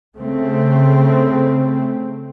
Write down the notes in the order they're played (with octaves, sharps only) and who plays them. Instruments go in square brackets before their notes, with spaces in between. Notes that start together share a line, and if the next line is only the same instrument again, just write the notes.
[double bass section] C#3 A3 C4